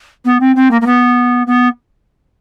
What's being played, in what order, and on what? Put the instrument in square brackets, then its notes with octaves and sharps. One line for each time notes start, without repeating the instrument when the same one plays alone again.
[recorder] B3
C4
C4
A#3
A#3
B3
B3